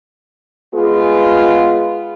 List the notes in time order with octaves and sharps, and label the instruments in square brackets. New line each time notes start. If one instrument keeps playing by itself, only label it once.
[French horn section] G#3 B3 F4 [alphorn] G#4